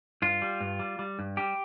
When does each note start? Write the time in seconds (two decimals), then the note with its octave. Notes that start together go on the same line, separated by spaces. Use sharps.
0.22 G2 F4
0.42 G3
0.61 G2
0.79 G3
0.99 G3
1.19 G2
1.37 G3 G4